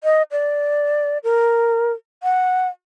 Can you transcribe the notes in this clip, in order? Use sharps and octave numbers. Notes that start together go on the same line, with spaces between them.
D#5
D5
A#4
F#5